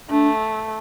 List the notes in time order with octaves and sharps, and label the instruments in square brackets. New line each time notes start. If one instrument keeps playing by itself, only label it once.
[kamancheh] A3 [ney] D4